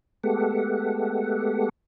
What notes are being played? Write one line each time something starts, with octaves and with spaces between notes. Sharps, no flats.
G#3 A3 B3 G4 A4 F#5